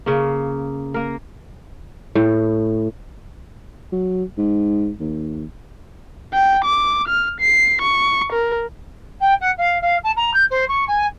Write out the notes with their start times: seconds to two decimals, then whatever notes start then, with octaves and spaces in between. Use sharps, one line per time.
0.06 C#3 A#3
0.94 A#3 A#4
2.15 A2
3.92 F#3
4.38 G#2
5.00 D#2
6.34 G5
6.64 D6
7.08 F6
7.40 C7
7.82 C#6
8.33 A#4
9.20 G5
9.41 F#5
9.57 F5
9.81 F5
10.03 A5
10.16 A#5
10.33 G6
10.50 C5
10.68 C#6
10.88 G#5